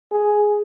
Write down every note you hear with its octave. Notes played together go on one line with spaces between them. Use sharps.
G#4